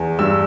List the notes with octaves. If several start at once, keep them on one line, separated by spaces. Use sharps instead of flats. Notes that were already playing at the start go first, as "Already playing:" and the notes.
Already playing: E2
G2 E6